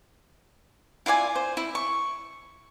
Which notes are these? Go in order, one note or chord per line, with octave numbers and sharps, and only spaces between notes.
E4 F4 D5 G#5
C5
E4
C#6